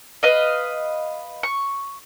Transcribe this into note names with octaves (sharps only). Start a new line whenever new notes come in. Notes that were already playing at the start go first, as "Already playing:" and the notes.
B4 D#5 F5
C#6